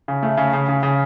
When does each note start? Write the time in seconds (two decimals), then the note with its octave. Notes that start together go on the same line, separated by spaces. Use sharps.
0.08 C#3
0.23 A3
0.37 C#3
0.53 C#3
0.68 C#3
0.83 C#3